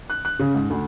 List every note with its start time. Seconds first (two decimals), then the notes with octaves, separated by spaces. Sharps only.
0.10 F#6
0.25 F#6
0.40 C#3
0.55 G#2
0.70 D2